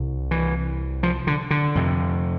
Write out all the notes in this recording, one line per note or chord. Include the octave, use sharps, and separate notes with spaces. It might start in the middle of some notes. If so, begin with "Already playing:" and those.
Already playing: C2 C3
E3
F3
D3
D3
F2 C3